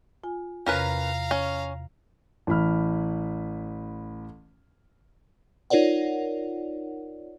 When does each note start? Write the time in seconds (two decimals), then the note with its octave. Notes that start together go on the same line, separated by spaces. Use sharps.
0.24 F4 G#5
0.66 E2 C3 C#4 A#4 B4 F5 A#5
1.31 C#4
2.47 A1 E4 B5 F6
5.70 D#4 F4 A#4 C#5 D5 F#5